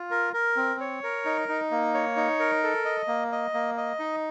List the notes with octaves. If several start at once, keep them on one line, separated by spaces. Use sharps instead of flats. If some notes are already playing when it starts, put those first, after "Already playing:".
Already playing: F4
A#4
A#4
C4
C#5
A#4
D#4
D#4
A#3
C#5
D#4
A#4
A4
D#5
A#3
D#5
A#3
D#5
D#4